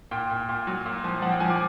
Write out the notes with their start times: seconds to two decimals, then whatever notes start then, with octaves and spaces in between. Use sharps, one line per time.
0.11 A#2 G5
0.31 A#2
0.49 A#2
0.67 F#3
0.86 A#2
1.04 F3
1.22 F3 F#5
1.32 G5
1.40 F3 G#5
1.50 D6